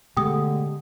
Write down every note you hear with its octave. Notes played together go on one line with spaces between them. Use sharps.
B2 D3 G#3 A3 G4 G5 D#6